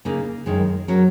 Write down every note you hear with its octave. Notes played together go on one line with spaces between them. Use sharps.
C#3 A#3 D#4
F#2 D#3 G#3
F#3 C#4 A#4